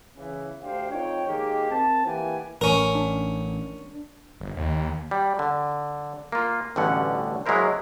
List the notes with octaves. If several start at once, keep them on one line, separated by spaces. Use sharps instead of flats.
C#3 E3
D2 D4 G4 C5 F5
F2 D#4 C#5 G5
D#3 G#3 A#3 G4
C4 A#4 A5
E3 A#3 G4 F#5 G#5
A1 C#4 A#4
D4
G1
D#2
G3
D3
A#3 F4
A1 G2 B2 D3 C#4 F#5
F#3 G#3 A#3 E4 A#4 C5